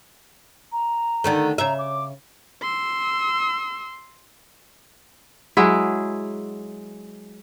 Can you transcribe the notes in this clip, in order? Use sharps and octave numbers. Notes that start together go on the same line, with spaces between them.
A#5
D3 D#3 A3
C#3 E5 A#5
D6
C6 E6
F#3 G#3 E4